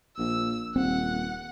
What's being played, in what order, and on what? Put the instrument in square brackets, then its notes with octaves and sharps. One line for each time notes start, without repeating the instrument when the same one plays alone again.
[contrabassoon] A#1 [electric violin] E6
[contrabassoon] D#1 [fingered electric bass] C4 [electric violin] F#5